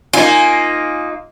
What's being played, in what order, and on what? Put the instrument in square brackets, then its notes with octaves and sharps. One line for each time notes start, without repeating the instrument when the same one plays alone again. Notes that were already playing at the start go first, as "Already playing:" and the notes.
[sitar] A#3 D#4 F4 [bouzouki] G#5